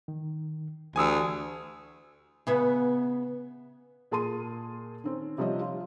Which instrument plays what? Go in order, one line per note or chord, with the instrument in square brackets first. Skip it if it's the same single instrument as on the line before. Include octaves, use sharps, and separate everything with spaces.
[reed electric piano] D#3
[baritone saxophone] D2 [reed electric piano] E3 G4 D5 [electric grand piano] G#5 D#6 E6
[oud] C#3 B3 E5
[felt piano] A#2 G#4 A5 C6 D#7
D#3 C4 C#4
C3 F3 G3 C#5 D#5
F4